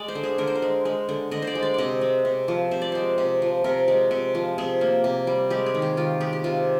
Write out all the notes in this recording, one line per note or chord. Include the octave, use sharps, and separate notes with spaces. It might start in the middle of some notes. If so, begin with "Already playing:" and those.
Already playing: G#3 D5
C5
D3
G#4
D3 A#4
C5
A#4
G#3
G#3
D3
D3 D#5
C5
D5
G#3
D5
C3 D5 D#5
G#3
C3
F3
C3 C5
D5
G#3 C5
C3
F3
C3 A#4
G#3
C3
F3
C3 G#4
A#3
C3
G3
G#3 G4
G#4
D#3
G4
D#3 F4
G#3 G4
G4
C3 F4